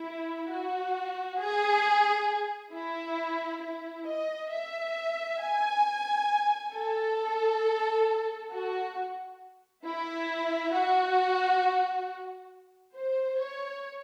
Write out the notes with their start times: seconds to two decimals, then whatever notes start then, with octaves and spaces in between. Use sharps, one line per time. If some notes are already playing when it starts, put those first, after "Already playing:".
Already playing: E4
0.51 F#4
1.40 G#4
2.74 E4
3.62 E4
4.07 D#5
4.51 E5
5.41 G#5
6.73 A4
8.52 F#4
9.85 E4
10.73 F#4
12.95 C5
13.39 C#5